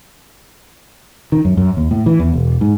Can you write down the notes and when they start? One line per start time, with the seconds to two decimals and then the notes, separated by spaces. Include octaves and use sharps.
1.32 D#3
1.45 F#2
1.57 F#2
1.77 D#2
1.91 A2
2.06 E3
2.19 E2
2.34 E1
2.61 G#2